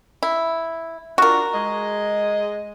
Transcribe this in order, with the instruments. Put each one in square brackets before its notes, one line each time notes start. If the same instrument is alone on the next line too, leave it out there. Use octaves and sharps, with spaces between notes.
[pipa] E4
[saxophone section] D4 F4 [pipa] F#4 A#4
[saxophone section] G#3 D#5